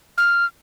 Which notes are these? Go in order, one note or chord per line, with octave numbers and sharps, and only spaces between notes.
F6